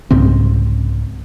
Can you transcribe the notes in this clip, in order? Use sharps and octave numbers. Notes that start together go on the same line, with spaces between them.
C2 G#2 C#3 C4